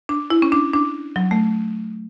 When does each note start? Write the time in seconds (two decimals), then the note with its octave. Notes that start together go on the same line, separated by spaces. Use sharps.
0.09 D4
0.30 E4
0.42 C#4
0.52 D4
0.74 D4
1.16 F#3
1.31 A3